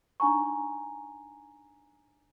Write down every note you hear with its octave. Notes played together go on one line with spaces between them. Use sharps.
D4 D#4 G#5 A#5 C#6